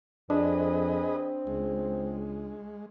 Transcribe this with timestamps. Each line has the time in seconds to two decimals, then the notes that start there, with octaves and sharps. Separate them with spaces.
0.30 F2 C4 D4 G#4 B4 D#5
1.47 C#2 G#3